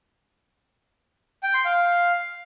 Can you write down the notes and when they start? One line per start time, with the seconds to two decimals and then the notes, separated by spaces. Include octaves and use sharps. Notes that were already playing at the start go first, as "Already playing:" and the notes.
1.43 G5
1.54 C6
1.65 F5